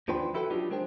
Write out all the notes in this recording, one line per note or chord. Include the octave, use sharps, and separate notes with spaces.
D#2 F3 D4 B4 C5 G5
E4 F#4 A4 B4 F#5 G5
F#3 G3 D4 D#4 F4 G4
G#3 D4 A#4 C5 G5